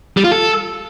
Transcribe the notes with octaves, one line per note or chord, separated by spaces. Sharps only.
G3
F4
A4